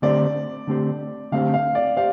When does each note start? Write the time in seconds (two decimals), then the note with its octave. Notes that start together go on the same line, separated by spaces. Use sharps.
0.02 D3 A3 C4 G4 C5 D5
0.67 D3 A3 C4 G4 C5
1.32 D3 A3 C4 G4 C5 F5
1.54 F5
1.75 D5
1.96 G4 C5 F5